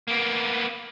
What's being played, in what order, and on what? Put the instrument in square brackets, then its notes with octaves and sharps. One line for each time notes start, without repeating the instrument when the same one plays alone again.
[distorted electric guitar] A#3 B3